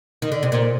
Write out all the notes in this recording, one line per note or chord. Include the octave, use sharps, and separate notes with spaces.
D#3
D3
C3
A#2